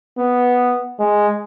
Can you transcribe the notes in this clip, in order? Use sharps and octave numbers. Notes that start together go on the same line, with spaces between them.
B3
G#3